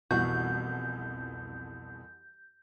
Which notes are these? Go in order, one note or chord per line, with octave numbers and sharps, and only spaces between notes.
C2 F2 B2 E3 F#4 G6